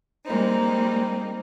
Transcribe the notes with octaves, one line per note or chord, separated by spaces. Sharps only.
G3 G#3 A#3 C4 D#4